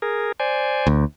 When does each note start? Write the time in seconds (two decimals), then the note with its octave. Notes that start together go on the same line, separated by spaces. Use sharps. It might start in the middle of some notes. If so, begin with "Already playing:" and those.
0.02 G#4 A#4
0.40 C5 D5 G#5
0.87 D2